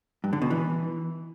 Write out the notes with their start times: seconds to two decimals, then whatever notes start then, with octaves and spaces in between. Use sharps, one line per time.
0.24 G2
0.33 D3
0.42 B2
0.50 E3